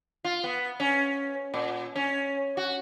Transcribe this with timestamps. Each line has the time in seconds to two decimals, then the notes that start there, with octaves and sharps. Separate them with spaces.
0.24 F4
0.44 B3
0.80 C#4
1.54 A#2
1.96 C#4
2.57 F#4